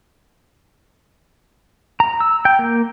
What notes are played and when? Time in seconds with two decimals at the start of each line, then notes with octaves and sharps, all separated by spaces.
2.00 A#5
2.20 E6
2.45 G5
2.59 A#3